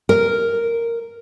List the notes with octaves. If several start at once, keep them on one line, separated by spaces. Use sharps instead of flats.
A#4